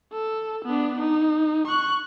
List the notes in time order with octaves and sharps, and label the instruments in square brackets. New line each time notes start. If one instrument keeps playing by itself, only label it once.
[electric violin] A4
B3 D4
D#4
C#6 F#6